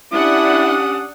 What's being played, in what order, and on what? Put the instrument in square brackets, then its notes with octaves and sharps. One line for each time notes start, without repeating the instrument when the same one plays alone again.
[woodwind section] C#4 G4 [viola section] D4 F#5 [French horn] E4 [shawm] D#6